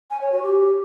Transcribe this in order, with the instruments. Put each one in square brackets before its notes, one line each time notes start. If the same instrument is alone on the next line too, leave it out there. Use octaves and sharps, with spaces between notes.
[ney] G#5
C#5
F#4
G4